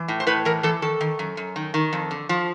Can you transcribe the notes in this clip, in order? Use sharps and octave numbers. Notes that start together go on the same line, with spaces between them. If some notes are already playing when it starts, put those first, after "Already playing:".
Already playing: E3
A2
C5
A2 B4
E3 A#4
E3 A4
D#3 A4
D#3
F#2
F#2
D#3
D#3
F2
D3
F3